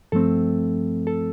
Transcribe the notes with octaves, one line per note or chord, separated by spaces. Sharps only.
G2 F3 A3 C4 A4
A4